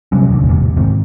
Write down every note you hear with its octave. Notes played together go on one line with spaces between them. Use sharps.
C3 F#3 G3 C#4
E1 A1 D#2 D3
E2 G#2 C3
G#2 D#3 C4